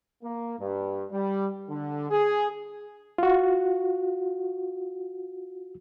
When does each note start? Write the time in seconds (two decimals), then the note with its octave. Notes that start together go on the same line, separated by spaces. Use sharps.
0.24 A#3
0.59 G2
1.11 G3
1.69 D3
2.11 G#4
3.18 F4 F#4